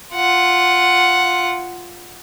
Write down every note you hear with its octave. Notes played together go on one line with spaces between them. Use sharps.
F4 F#5